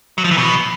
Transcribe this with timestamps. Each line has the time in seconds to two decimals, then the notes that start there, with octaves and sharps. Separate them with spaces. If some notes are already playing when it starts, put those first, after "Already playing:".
0.18 F#3
0.24 F3
0.31 E3
0.38 B2